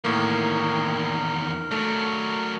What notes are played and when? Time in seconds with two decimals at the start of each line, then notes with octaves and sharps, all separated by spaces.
0.04 E2 A2 D#3 A#3 A#4
1.71 F#3 A3 D4